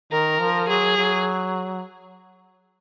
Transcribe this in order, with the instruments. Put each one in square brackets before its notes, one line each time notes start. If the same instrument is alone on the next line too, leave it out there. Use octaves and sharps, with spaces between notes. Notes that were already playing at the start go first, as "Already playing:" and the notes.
[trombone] D#3 [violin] A#4
[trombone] F3
[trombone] F#3 [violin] G#4
[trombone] F#3